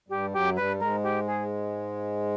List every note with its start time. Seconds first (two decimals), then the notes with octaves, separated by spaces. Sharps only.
0.09 G2 G3 G4
0.32 F#2 F#3 G4
0.56 G2 G3 B4
0.80 G#2 G#3 A#4
1.03 G4
1.27 G#4